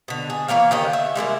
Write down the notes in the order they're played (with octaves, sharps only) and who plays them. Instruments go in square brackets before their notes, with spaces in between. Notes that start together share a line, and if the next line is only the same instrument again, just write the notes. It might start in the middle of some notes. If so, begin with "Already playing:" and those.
[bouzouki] B2 D3
G#4
E3 A#3 C#5 F5
D3 D#3 G4 D#5
E5
G3 G#3 A#3 E4